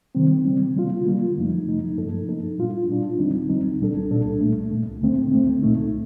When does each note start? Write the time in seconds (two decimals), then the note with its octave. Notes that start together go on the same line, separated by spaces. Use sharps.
0.15 C3 D#3 G3 C4
0.45 C3 D#3 G3 C4
0.76 D3 G3 A#3 F4
1.06 D3 G3 A#3 F4
1.37 F2 C3 F3 A3 D#4
1.67 F2 C3 F3 A3 D#4
1.97 G2 F3 A#3 D#4 A4
2.28 G2 F3 A#3 D#4 A4
2.58 A#2 G3 D4 F4
2.88 A#2 G3 D4 F4
3.19 D#2 D3 G3 C4 D#4
3.49 D#2 D3 G3 C4 D#4
3.79 C2 A#2 G3 D4 A4
4.10 C2 A#2 G3 D4 A4
4.41 C2 A#2 A3
4.71 C2 A#2 A3
5.01 D2 D3 A3 C4
5.31 D2 D3 A3 C4
5.62 C2 A#2 A3 D#4